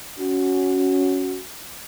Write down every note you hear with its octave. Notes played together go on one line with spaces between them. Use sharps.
C#4 F#4